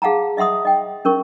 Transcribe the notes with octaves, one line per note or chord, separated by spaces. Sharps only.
G#4 F5 F#5 A5 A#5
D#5 E5 F#5 C6 D#6
D#5 G5
C#4 A#4 C#6